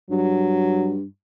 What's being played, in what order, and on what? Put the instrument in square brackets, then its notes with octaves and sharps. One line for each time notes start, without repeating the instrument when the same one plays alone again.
[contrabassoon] G2 [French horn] F#3